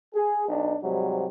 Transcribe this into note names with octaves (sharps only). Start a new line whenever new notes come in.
G#4
B1 D4 D#4
G#2 C3 F#3 G3